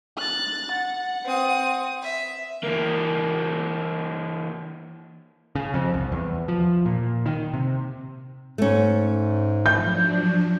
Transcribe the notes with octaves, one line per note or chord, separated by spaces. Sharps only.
F#6 A6
F#5
C4 D#6
E5
E3 A#3
C#3
F2
C2
E2
F3
A#2
D#3
C3
G#2 A3 C#4
F3 F#3 D4 G6